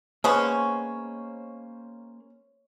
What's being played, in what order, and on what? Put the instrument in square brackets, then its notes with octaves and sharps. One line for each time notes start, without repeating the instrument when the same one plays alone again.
[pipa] G#3 B3 C#4 [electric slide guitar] A#3 C5 [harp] C#5 C#6